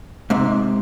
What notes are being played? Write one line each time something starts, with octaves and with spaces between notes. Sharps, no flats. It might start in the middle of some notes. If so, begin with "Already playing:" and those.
G#2 C3